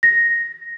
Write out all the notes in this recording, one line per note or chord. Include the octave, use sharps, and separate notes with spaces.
A#6